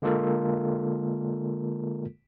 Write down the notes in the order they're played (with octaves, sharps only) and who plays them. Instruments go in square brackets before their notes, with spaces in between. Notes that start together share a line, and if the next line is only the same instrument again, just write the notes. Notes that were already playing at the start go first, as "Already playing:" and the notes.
[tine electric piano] D3 G#3 A#3 F4 A4 A#4